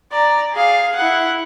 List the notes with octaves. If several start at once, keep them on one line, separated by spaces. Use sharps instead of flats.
D5 A#5
G#4 F5
E4 F#5